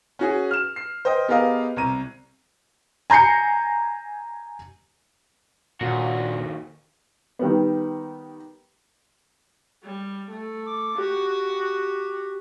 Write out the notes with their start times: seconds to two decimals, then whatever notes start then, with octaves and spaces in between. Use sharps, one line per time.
0.19 C#4 F#4 G#4
0.51 F6 E7
0.76 C7
1.05 C5 D#5 G5
1.28 B3 G4 G#4 A#4 D#5 F5
1.76 C2 A#5 D#7
3.10 G#5 A#5 G6 C7 C#7
5.81 D#2 A#2 F#4
7.39 D#3 G3 B3
9.84 G3
10.31 A3
10.66 D6
10.98 F#4 G4